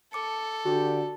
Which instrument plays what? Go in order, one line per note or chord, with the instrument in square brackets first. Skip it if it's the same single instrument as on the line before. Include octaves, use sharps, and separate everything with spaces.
[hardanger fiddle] A4 [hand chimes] A5 D6 C#7
[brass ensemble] D3 G4 [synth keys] F#4